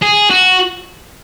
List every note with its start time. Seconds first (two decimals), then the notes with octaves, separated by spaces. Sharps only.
0.02 G#4
0.30 F#4